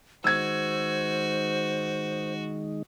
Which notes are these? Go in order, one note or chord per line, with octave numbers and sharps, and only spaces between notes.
D#3 G#3 D#4 F#4 C5 E6 G#6